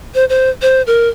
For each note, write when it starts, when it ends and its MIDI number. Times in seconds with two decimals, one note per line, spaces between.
0.15 0.25 72
0.29 0.50 72
0.62 0.82 72
0.87 1.09 70